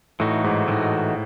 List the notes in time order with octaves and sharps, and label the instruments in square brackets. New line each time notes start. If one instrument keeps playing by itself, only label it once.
[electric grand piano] A2 [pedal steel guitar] E3 A3 D#4 F#4
[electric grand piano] G#2
[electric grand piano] A2 [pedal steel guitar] E3 A3 D#4 F#4